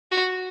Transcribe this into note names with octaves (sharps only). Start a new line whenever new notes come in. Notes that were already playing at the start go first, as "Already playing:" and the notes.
F#4